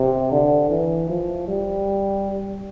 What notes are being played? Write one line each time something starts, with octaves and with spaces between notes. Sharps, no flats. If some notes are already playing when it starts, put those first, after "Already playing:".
Already playing: C3
D3
E3
F3
G3